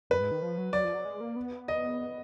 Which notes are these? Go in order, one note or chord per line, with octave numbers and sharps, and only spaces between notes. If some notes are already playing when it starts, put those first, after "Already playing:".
F#2 B4
G#2
D#3
F3
F#3
F#3 D5
F3
F#3
G#3
A#3
B3
D#5